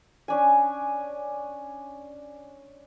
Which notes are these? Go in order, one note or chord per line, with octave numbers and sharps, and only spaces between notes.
C#4 D4 G#5